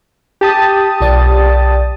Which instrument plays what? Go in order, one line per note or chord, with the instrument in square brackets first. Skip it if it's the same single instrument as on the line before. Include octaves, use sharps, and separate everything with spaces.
[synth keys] G4 A5 D#6
[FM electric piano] B1 D5 A6